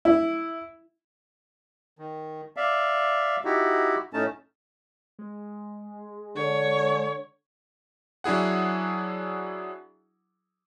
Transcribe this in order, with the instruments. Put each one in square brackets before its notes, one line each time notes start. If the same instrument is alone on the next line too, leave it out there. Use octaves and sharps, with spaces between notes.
[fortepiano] E4
[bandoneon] D#3
D5 E5 F5
D#4 E4 F#4 G4
A2 A3 C#4 D#4 A5
[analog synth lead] G#3
[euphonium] D3 [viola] C#5
[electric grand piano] F#3 D4 E4 G#4 F#5